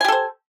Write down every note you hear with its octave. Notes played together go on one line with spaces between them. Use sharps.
G4 A4 C5 G#5